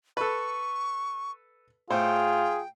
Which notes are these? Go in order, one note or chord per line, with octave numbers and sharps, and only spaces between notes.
A4 B4 C#6
A2 F4 G#4 C5 G5